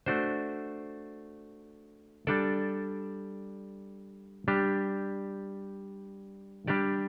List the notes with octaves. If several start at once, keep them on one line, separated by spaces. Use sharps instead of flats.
A3 D4 F#4 C5
G3 D4 A4 D5
G3 D4 G4
G3 D4 G4 D5